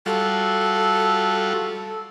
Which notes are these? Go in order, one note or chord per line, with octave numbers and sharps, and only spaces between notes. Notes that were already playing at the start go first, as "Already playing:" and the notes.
G3 F4 F#4 A4